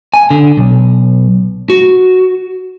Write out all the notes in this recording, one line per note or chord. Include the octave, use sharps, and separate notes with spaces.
G#5
D3
B1
F#4